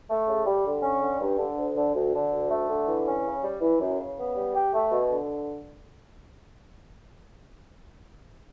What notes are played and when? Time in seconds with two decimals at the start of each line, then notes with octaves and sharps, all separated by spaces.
0.09 A3
0.27 C#3
0.45 G3
0.65 D3
0.82 C#4
1.01 D3
1.20 G2
1.39 D3
1.57 D2
1.76 D3
1.94 D2
2.13 D3
2.31 D2
2.51 A3
2.69 D3
2.87 E3
3.06 C#4
3.25 C#3
3.43 G3
3.61 E3
3.80 F#2
3.99 C#3
4.18 B3
4.35 G3
4.54 G4
4.73 A3
4.91 B2
5.11 D3